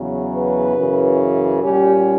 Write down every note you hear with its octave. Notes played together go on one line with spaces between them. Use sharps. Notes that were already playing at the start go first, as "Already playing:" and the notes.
Already playing: E2 C#3 F#3
B4
F#2 C#3 E3
A#2 G3 C#4 G4